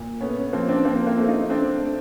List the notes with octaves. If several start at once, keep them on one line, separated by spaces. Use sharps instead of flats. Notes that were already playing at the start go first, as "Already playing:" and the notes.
Already playing: A#2
A3 B3 C#4
B3 C#4
F3 A#3 C4
C4 D4
F3 A#3 C4
A#3 C4
A3
D#4 F4
A3 C4 D4
A3